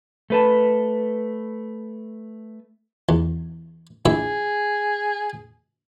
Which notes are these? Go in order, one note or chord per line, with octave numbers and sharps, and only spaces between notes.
A3 B4 A5
E2
A#1 E4 G#4 E5